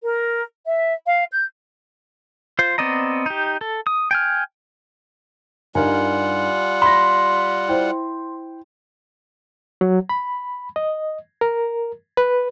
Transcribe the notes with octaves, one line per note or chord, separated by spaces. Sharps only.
A#4
E5
F5
G6
F4 C5
B3 C4 D5 D#5 A#5
D#4 G4
A4
D#6
G5 G#5 F6
G2 G3 D#4 F4 A#4 F#5 G#5
B5 C6 A#6
E4 C5 G5
F#3
B5
D#5
A#4
B4